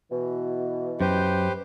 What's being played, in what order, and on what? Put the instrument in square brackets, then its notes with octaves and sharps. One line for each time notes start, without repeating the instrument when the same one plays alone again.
[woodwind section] B2 E3
[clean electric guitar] F#2 [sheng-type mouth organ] G4 B4 C5